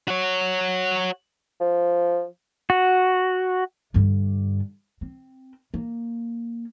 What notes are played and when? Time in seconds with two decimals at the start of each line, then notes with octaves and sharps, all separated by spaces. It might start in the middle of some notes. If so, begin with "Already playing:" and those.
0.08 F#4 C#5
1.60 F3
2.70 F#4
3.94 G2 D3
5.01 C4
5.74 A#3